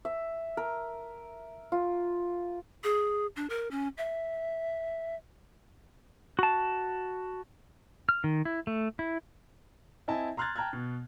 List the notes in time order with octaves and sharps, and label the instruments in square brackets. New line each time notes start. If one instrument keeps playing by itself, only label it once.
[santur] E5
A#4
F4
[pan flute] G#4
D4
A#4
C#4
E5
[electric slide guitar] F#4 A5
[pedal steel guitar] F6
D#3
E4
A3
E4
[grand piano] C4 E4 D#5 E5 G#5 A5
A#5 C6 F6 F#6 G#6 A6
G5 A5 A#5 F6 F#6 G#6
B2